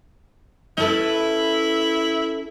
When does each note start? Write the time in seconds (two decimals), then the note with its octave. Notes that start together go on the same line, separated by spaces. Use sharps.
0.78 C#4 E4 A4 B4